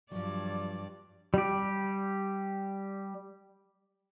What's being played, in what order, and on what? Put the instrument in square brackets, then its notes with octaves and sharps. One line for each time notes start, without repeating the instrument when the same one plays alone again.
[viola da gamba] G2 D5 [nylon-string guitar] F3 F#3
[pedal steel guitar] G3 G4